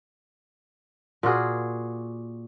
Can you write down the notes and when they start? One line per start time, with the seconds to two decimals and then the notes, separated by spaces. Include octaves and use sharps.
1.23 A#2 F4 F#4 G#4